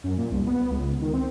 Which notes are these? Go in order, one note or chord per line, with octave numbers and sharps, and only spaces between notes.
F#2
A#2
C2
B3
C#2
D#3
C4